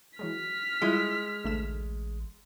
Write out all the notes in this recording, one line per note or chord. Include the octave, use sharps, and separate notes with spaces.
E3 F#3 G#3 F6 B6
G3 G#3 E4 F4
A1 D2 A3 E7